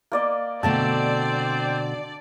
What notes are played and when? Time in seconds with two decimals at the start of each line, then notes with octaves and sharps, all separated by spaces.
0.12 A#3 D5 D#5
0.63 B2 D3 A3 C4 D5 A5